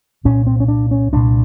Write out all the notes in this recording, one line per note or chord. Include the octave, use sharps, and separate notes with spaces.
C2 A#2 C#4
C4
C#4
D4
C#4
C2 A#2 D4